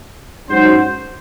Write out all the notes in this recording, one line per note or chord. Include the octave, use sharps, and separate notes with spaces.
G#2 F#3 C#4 F#4 C5